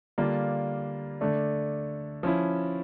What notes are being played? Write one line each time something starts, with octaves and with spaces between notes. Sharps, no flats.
D3 G3 A#3 D4 F4
D3 A3 D4
F3 C#4 E4